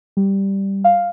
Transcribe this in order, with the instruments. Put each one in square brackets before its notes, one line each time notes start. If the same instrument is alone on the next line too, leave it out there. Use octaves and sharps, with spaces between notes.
[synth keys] G3
F5